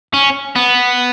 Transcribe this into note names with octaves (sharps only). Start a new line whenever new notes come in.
C#4
B3